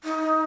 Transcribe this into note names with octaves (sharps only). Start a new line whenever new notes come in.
D#4